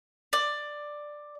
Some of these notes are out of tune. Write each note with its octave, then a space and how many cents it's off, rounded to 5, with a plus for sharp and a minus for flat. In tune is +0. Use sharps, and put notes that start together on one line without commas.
D5 +10